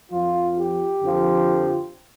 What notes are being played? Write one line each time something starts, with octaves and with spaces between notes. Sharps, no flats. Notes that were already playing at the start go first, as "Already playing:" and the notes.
F2 F3 F4
G4
F2 D3 F3